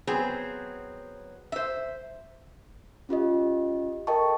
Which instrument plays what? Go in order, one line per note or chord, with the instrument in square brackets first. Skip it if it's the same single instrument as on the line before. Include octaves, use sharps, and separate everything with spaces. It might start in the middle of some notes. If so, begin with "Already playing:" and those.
[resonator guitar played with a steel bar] F#3 B3 C4 G#4 C5
C5 E5
[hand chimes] C#4 F4 G4 D#5
A4 A#4 D#5 G5 A5 C#6